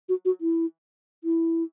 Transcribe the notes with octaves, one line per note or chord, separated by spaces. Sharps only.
F#4
F#4
E4
E4